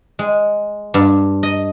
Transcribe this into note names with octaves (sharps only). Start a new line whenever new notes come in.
G#3
G2
D#5